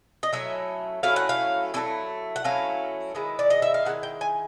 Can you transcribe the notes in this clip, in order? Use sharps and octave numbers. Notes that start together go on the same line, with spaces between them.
D#5
F#3 A3 C#4 E4 E5
F#3 A3 C#4 E4 F5
F#5
F5
F#3 A3 C#4 E4
F#5
F#3 A3 C#4 E4 F5
D#3 G#3 B3 E4
D5
D#5
E5
F5
D#3 G#3 E4 F#5
G5
G#5